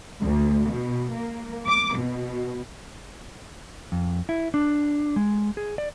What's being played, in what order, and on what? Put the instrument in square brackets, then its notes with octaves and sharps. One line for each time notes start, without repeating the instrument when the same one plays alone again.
[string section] D2
B2
A#3
D6
B2
[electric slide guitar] F2
E4
D4
G#3
G#4
D5